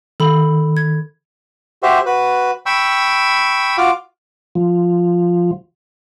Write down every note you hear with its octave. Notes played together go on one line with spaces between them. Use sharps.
D#3 A4 B5
G#6
F#4 G4 C5 E5
F#4 B4
G5 B5 C#6 E6
F4 F#4 F5 D6
F3